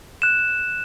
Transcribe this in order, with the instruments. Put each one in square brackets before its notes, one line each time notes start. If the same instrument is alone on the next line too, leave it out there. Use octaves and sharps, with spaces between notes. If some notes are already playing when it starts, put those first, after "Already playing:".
[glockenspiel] F#6 E7